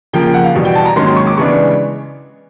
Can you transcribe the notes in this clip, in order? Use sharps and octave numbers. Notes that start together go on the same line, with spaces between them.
C#3 F3 A#3 G5
G5
F#5
F5
E2 B2 G3
G5
A5
A#5
G#2 D#3 F#3 A#3 C#4 C6
C6
C#6
D6
C#3 E3 G#3 B3 D4 C#6